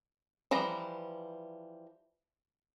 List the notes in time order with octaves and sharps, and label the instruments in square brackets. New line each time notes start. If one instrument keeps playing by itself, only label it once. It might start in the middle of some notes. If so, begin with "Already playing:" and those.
[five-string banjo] E3 F3 G3 A#5